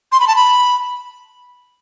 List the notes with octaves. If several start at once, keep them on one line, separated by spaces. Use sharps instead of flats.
C6
B5
A5
B5